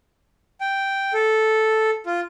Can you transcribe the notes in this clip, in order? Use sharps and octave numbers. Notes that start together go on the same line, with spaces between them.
G5
A4
F4